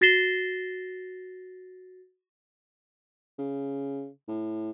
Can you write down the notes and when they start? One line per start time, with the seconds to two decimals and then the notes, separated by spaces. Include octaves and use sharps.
0.01 F#4 A6 A#6 C7 E7 G7
3.39 C#3
4.28 A2